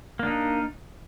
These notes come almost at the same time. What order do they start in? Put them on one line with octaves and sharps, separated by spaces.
A#3 D4 D#4